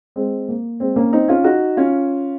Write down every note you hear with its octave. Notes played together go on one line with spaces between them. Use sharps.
G#3 C4
A#3
G#3 C4
A#3 C#4
C4 D#4
C#4 F4
D#4 F#4
C#4 F4